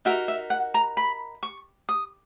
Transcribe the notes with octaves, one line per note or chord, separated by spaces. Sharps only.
D#4 F#4 A#4 E5
E5
F#5
A#5
B5
C#6
D#6